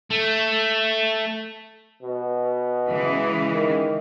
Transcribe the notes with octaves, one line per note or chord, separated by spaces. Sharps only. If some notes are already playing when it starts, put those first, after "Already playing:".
A3
B2
C#3 E3 G#3
D#3